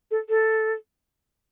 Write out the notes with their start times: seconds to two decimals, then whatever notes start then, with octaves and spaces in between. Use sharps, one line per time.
0.11 A4
0.29 A4